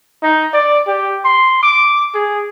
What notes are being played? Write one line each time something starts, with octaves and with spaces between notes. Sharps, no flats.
D#4
D5
G4
C6
D6
G#4